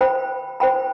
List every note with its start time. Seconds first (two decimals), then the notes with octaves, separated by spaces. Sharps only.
0.01 C5 G5 B5
0.60 C5 G5 B5